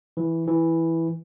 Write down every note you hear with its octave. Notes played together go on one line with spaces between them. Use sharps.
E3
E3